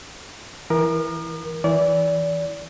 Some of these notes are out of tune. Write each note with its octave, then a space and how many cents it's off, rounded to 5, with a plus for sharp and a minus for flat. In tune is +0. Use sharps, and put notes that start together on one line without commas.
E3 +0 A#4 +15 D#6 -45
E3 -15 D5 -30